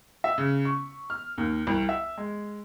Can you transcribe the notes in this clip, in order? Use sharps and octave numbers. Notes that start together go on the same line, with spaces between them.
E5
C#3
C#6
F6
D#2
C2
E5
G#3